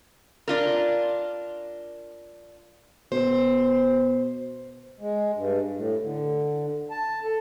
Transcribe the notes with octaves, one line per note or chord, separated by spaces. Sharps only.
D4 F4 A#4
B2 C5
G#3
G2
A2
D3
A5
A4